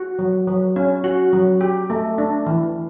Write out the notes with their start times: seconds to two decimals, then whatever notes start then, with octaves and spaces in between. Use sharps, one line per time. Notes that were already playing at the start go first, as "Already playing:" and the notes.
Already playing: F#4
0.19 F#3
0.48 F#3
0.76 C#4
1.04 F#4
1.33 F#3
1.61 G4
1.90 A3
2.18 D4
2.47 E3